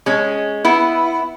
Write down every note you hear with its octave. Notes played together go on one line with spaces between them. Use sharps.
G#3 C#4
B3 E4